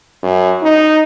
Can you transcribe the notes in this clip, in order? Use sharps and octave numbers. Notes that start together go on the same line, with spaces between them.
F#2
D#4